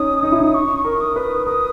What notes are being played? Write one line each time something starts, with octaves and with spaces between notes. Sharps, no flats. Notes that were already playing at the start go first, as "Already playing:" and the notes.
Already playing: C#4 D#4 D#6
D#4
E4
D#4
C#6
A#4
D#6
B4
A#4 D#6